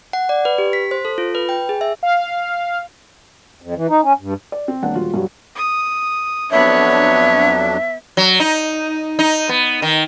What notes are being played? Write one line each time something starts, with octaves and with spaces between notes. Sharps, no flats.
F#5
D5
B4
G4
B6
C5
A4
F4
B4
G5
G#4
E5
F5
F2
E3
D#4
C#4
G2
D5
C4
E1 A#3 D4 F#5
D#1 F4 F#4
G2 F#3 G3
D#6
F2 F#3 B3 D4 C#5 E5
F#3
D#4
D#4
B3
D#3